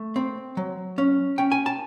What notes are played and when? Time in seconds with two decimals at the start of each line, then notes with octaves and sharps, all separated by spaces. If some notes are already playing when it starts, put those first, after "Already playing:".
Already playing: A3
0.16 C4
0.57 F#3
0.98 C#4
1.38 C#4 G5
1.52 G#5
1.66 A5